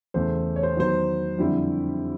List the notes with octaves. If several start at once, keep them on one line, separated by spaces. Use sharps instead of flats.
E2 C#3 E3 A3 C5
C#5
C5
D#3 F#3 B3 C5
F2 D3 G3 C4 E4